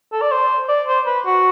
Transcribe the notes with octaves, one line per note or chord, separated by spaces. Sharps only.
A4
D5
C5
D5
C5
B4
F#4